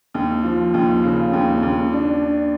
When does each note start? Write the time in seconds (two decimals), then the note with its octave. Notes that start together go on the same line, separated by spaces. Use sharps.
0.15 D#2
0.43 F3
0.74 D#2
1.03 C#3
1.33 D#2
1.63 D#2
1.93 D4
2.22 D4